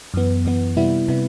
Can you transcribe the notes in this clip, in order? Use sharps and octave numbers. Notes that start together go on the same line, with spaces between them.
F#2 E3 B3
F#2 E3 B3
C3 G3 B3 E4
C3 G3 B3 E4